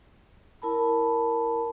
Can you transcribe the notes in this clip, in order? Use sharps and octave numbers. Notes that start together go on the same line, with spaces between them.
E4 A#4 A5 B5